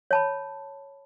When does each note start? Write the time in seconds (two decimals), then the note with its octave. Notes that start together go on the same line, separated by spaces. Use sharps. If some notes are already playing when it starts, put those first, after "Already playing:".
0.11 C#5 A5 B5